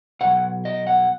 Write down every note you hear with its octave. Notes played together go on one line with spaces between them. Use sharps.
B2 F#3 F#5
D#5
F#5